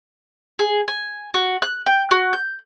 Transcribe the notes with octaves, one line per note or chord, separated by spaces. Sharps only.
G#4
G#5
F#4
F#6
G5
F#4
G6